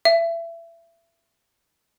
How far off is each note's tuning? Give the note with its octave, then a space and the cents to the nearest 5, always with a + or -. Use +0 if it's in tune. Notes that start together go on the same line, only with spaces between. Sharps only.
E5 +25